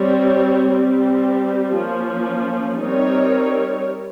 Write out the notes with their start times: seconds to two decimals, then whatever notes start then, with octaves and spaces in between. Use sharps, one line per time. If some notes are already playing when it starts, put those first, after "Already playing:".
Already playing: G3 C4 G4 C#5
0.69 G3 C4 G4
1.74 F3 A#3 C#4
2.80 G3 C4 D#4 A#4 C#5